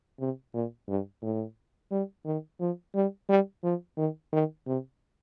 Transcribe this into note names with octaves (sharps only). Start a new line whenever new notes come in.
C3
A#2
G2
A2
G3
D#3
F3
G3
G3
F3
D#3
D#3
C3